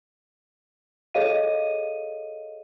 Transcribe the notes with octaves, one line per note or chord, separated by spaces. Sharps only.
G#4 A4 C#5 D#5 F5 D#7